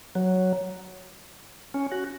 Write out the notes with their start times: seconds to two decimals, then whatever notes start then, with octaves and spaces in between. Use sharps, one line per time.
0.15 F#3
1.74 C#4
1.92 F#4